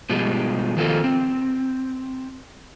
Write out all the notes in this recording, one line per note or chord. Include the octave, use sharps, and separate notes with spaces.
B2 F3 G3 G#3
D#3 F3 A#3 C4 F4 A4
C4